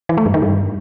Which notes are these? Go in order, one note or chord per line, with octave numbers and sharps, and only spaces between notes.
E3
A3
G2
D#3
G2